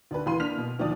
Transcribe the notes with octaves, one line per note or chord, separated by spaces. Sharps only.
D2 D4 B4
E2 E3 F5 B5 C6 D#7
A#3 D4 F6 B6 F7
B2
G1 D#2 F3 D5 D#6